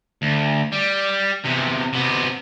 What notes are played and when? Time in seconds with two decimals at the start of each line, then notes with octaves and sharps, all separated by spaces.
0.22 D2
0.72 G3
1.44 E2 C3
1.93 C3 B3